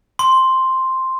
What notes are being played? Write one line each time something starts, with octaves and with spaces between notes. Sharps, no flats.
C6